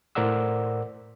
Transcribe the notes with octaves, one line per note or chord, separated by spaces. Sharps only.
A2 A#4 C5 D5 F#5 E6